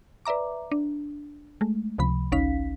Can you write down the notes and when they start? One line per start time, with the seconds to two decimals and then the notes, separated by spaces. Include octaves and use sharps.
0.25 B4 D5 E5 A#5 D6
0.72 D4
1.61 G#3 A3
1.98 C#2 C3 F3 B5
2.32 G#1 C#2 C#4 D#4 F5 B6